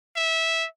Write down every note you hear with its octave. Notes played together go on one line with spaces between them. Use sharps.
E5